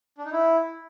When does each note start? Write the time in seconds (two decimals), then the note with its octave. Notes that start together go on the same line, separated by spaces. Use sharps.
0.18 D4
0.25 D#4
0.32 E4